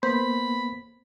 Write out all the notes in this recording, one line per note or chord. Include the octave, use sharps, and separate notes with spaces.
A#3 B3 C5 B5